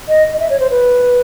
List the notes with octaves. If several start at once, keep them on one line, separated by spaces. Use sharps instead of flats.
D#5
D#5
E5
C#5
C5
B4